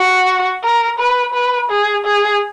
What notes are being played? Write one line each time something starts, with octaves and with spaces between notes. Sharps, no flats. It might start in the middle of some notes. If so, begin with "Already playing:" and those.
Already playing: F#4
A#4
B4
B4
G#4
G#4